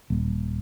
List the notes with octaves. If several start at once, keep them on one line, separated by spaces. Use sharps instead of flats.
D#1